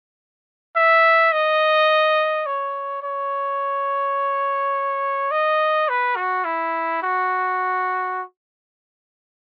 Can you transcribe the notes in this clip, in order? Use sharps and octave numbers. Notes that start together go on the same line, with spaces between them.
E5
D#5
C#5
C#5
D#5
B4
F#4
E4
F#4